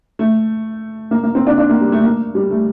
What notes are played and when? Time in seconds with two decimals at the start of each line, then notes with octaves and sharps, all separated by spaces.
0.19 A3
1.11 A#3
1.23 A#3
1.35 C4
1.47 D4
1.58 D4
1.69 A#3
1.81 G3
1.92 A3
2.04 A#3
2.35 G3
2.51 A3